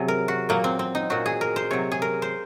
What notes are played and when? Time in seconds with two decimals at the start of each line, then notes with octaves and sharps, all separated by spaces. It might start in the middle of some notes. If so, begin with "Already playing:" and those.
Already playing: C3 F#3 G#4
0.08 A#4
0.28 F#4
0.49 A#2 F#3 A#3
0.64 C4
0.79 C4
0.95 D#4
1.10 A#2 F#3 F#4
1.26 G#4
1.41 A#4
1.56 C5
1.71 C3 F#3 C#5
1.92 G#4
2.02 A#4
2.22 C5